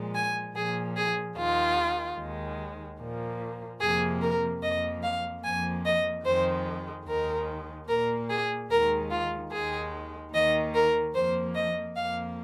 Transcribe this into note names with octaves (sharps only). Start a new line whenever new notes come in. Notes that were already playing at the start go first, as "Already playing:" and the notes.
Already playing: A#2 F3 G#3
G#5
A#2 F3 A#3 G#4
G#4
D#2 D#3 G#3 F4
D#2 D#3 G#3
A#2 F3 A#3
F2 C3 F3 A#3 G#4
A#4
F2 F3 A#3 D#5
F5
F2 F3 A#3 G#5
D#5
F2 D#3 G#3 C5
D#2 D#3 G#3 A#4
A#2 A#3 A#4
G#4
D#2 D#3 G#3 A#4
F4
D#2 D#3 G#3 G#4
D#2 D#3 A#3 D#5
A#4
F2 F3 A#3 C5
D#5
F2 F3 A#3 F5